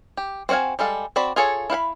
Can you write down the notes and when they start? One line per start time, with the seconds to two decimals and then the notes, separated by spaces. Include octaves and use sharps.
0.17 G4
0.49 C4 F#4 C#5 F5 G#5
0.79 G3 G#3 A4 F5
1.16 C4 F#4 D5 B5
1.36 F4 G#4 A4 C#5
1.70 E4 F5 F#5 B5